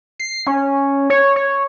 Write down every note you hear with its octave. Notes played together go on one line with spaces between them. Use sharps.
C7
C#4
C#5
C#5